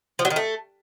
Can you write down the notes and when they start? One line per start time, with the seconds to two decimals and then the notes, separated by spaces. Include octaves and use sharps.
0.19 F3
0.25 F#3
0.30 D#3
0.36 A3